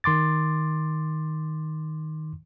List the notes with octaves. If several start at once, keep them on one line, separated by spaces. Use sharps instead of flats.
D#3 C6 D6 A6